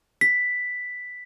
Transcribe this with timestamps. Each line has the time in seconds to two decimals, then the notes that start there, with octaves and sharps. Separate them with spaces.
0.21 B6